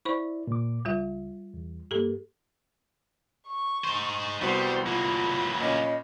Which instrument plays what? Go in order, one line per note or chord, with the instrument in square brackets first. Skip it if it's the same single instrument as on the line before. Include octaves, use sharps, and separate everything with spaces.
[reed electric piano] E4 D5 [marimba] C5 B5 C#6
[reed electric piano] A#2 D6
[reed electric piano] C#2 [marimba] G3 F4 E5
[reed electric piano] E2
[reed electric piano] G2 A#3 [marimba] G4 A4
[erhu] C#6
[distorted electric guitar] D#4 C5
[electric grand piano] C2 B3 [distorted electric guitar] G3 [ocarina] F#4 [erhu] C5
[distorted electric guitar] F#3 A#3 [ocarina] F4 [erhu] B5
[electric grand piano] A#2 C#4 [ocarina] D#5